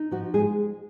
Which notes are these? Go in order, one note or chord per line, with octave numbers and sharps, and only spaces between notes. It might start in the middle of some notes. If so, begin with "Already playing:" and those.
Already playing: D#4
F3 F#4
G#3 G#4